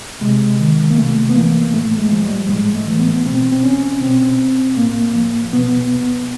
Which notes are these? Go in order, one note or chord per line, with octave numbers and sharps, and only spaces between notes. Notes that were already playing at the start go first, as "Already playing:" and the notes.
C3 G#3
D#3
A#3
C3 A3
B3
E3 A#3
A2 A3
G#3
F3
G3
A2 G#3
A3
E3
B3
B2 C4
C4
C#4
B2 C4
A2 A#3
F3
B2 B3